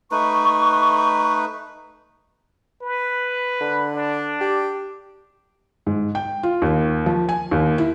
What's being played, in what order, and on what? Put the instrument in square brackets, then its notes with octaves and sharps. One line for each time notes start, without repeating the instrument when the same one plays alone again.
[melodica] A3 D#4 B4 [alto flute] C#6
[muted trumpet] B4
[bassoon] D3
[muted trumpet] D4
[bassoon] G4
[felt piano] G#2
G5
F4
D#2
F3
G#5
D#2
E4